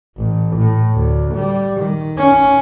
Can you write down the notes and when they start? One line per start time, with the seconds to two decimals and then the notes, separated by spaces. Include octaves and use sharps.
0.18 A1
0.57 A2
0.95 D2
1.35 G3
1.81 D#3
2.18 C#4